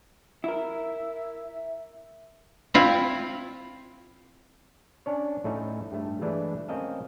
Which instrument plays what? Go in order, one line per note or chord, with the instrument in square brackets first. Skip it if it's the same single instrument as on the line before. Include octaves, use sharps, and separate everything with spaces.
[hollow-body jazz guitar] E4 A#4 [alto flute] E5
[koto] C4 E4 F4
[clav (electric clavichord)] C#4 D4 C#5
A2 A3 C#4 D#4
G2 A3
E3 G#3 A3 D4 E4
C4 C#4 A#4 D#5 F5 A5